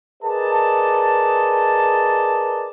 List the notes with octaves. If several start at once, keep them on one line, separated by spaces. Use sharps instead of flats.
G#4 A#4 B4 D5 D#5 A5